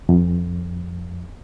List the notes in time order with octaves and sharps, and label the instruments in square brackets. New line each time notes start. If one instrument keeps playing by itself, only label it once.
[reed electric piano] F2